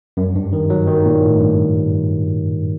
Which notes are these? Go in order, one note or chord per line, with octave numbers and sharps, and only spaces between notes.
F#2
G2
D#3
F#3
D#3
A#2
A2
G2